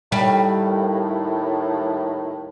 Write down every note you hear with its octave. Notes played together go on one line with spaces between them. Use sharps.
D#2 A2 G3